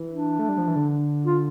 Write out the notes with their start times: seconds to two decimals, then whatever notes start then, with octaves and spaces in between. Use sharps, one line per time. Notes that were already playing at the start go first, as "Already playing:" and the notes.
Already playing: E3
0.10 D4
0.39 A3
0.49 G3
0.58 F3
0.68 E3
0.76 D3
1.26 F4